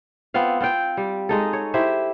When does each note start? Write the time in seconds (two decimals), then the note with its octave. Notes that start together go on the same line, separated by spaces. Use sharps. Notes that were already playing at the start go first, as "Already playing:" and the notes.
0.34 B3 C4 F4 F5
0.60 C4 F4 F5 G5
0.97 G3
1.29 G#3 D#4 A4
1.53 C#5
1.74 E4 G4 C5 E5